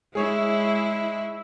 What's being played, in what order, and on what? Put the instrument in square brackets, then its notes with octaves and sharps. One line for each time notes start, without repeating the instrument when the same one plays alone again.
[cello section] G#3 E4 [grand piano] G#4 C#5